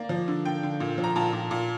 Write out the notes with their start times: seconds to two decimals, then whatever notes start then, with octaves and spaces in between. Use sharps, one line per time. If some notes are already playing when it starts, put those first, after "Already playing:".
Already playing: A#3 D5
0.09 F3
0.28 D3
0.45 D3 G5
0.63 D3
0.80 A#2
0.98 F3
1.04 A#5
1.16 A#2 A5
1.33 A#2
1.51 A#2